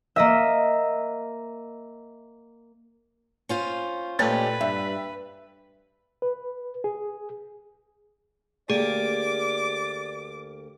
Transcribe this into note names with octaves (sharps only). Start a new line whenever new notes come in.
A#3 D#5 E5
C#4 F4 C5
A#2 A3 C#4 G4 B4 D#5 A6
G2 E5
B4
G#4
D2 A#3 G4 G#4 D5 D6